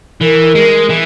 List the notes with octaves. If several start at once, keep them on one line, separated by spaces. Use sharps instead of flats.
E3 A#4
G#3
E3